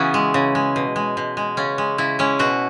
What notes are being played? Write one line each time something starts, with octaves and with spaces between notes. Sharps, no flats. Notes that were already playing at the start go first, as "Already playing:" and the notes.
Already playing: C#3 E3 B3 C#4 E4 F#4
G#3
C#3
G#3
B2
G#3
B2
G#3
C#3 C#4
G#3
C#3 E4
G#3 C#4
B2 F#4